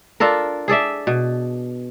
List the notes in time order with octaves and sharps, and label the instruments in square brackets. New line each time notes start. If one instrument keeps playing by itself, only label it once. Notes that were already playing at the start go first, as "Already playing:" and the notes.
[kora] D4 F4 A4 A#4
G#4 A4 D5 E5
B2